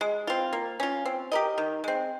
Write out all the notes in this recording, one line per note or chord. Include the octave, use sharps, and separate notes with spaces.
G#3
C4 F4
A#3
C#4 F4
C4
G4 A#4 D#5
D#3
G#3 C4